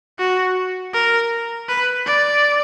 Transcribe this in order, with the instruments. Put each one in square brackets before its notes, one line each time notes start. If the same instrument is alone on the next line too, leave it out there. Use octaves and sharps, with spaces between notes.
[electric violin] F#4
A#4
B4
D5